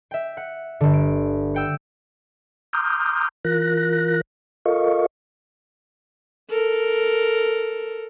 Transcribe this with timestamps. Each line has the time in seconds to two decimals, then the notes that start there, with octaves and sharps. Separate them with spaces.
0.11 E5 G5
0.37 F#5
0.81 G1 D3
0.94 D7
1.54 F#5 G5 E6
2.73 A#5 C6 D6 D#6 F6 G6
3.45 E3 F4 A#4 F#6 A#6
4.66 F4 A4 A#4 D#5 F5 C#6
6.50 A4 A#4